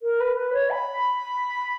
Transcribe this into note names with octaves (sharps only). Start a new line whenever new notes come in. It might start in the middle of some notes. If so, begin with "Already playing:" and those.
A#4
B4
B4
C#5
B5